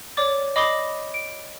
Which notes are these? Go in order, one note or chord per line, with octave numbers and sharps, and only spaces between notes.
C#5 D5 D6 A6
D#5 B5 D6 D#6 C7 G7
D7